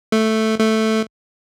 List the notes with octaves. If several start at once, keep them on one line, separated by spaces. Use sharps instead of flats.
A3
A3